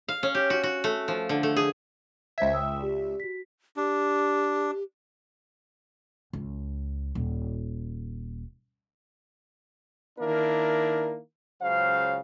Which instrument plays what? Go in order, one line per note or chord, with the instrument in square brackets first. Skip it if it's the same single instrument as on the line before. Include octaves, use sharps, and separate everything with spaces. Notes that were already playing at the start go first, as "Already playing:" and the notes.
[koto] F5
C#4
G4
F#4
F#4
A3
F3
D3
A3
G#4
[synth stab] C#2 E5 [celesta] C5 G#6
[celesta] G5 D#6 E6
G4 D5
F#4 B6
[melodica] D4 [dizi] G4
[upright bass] C#2
D#1
[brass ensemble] D#3 A#3 D4 E4 A#4
C#2 C#3 F#3 C5 F5